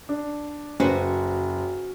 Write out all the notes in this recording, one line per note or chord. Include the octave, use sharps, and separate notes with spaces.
D4
F#1 F#4 B4 C5